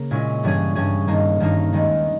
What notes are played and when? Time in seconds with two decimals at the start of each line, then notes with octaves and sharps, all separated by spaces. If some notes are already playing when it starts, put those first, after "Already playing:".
Already playing: C#3 A#3 A#4
0.11 A#2 G#3 C#4 E4
0.44 G2 E3 G3 C#4 G#4
0.75 G2 E3 G3 C#4 G#4
1.07 G2 D#3 A#3 D#4
1.40 G2 D#3 A#3 D#4
1.73 D#2 D#3 G#3 B3